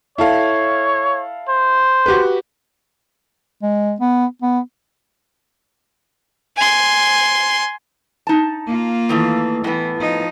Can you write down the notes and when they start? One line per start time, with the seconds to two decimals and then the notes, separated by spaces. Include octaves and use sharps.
0.18 E4 A4 C#5 F5
1.49 C5
2.06 F#4 G4 B4
3.63 G#3
4.00 B3
4.42 B3
6.57 G#5 C6
8.27 D#4 A5
8.66 A#3 F4
9.09 D#3 E3 A3
9.64 A2 E3 B3
9.99 F3 D#4